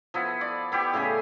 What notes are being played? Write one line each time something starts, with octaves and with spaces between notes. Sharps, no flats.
F3 B3 E4
D5
B3 E4 G4 G5
A2 C#3 G#4 G#5